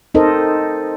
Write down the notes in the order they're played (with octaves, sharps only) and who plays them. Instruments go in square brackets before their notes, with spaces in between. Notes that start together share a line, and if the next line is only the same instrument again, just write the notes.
[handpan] C4 D#4 A4 A#4 C5 D#5